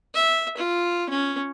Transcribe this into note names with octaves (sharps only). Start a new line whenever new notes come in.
E5
F4
C#4